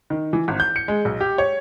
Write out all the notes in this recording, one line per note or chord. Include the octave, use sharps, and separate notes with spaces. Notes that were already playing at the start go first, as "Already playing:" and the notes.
D#3
E3
G#1
G6
C#7
G#3
B1
G4
C#5